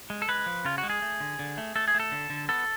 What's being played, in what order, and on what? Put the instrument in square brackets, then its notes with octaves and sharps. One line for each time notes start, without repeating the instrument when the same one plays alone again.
[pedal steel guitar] G#3
A4
G#3 B4
F3
C#3 F4
F#4
G#3
G#4
A3
D3
D3
A3
A3 A4
G#4
A3
A4
D3
D3
B3 A4